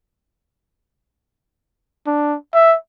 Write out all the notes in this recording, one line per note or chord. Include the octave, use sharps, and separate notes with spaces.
D4
E5